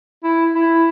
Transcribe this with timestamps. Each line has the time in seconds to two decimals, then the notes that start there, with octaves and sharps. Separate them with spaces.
0.24 E4
0.55 E4